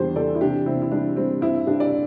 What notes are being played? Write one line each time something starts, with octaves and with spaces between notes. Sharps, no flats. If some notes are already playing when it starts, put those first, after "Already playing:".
Already playing: E2 G3 D4 G4 C5
E3 A4 D5
E4
C3 D4 G4
C3 C4 E4
E4
G3 D4
G3 C4
G2 C4 E4
G2 D4 G4
D5